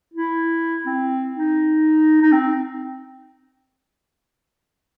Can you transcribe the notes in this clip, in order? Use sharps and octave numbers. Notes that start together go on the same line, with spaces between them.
E4
C4
D#4
D#4
C4